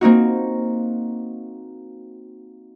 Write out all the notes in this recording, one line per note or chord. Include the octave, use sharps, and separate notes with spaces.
A#3 C4 D#4 F#4